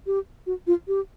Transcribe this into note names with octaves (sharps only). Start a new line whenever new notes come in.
G4
F#4
F4
G4